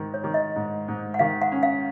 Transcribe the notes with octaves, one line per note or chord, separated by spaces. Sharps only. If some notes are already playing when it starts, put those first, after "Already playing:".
Already playing: G#2 D#3
C#5
D#3
D#5
G#2
G#2
F#5
D#3 F5
F#5
C#4
F5